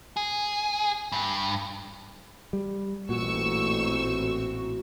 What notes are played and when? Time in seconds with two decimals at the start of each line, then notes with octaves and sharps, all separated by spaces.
0.17 G#4
1.12 G2
2.53 G3
3.09 A1 A#2 C4 F#4 C#6 E6